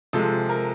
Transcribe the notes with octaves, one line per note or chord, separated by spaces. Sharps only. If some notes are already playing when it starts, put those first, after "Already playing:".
C3 F3 G#3 A4
A#4